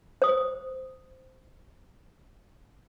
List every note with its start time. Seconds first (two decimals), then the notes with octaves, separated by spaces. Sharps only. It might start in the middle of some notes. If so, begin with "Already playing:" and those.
0.22 C5 D#6